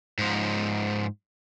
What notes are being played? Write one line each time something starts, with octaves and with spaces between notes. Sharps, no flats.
G#2 F3